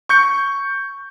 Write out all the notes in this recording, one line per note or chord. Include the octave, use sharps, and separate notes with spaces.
C#6 G6 C#7